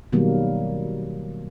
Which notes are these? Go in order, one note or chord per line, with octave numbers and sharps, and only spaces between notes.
B2 D#3 F#3 G3 A#3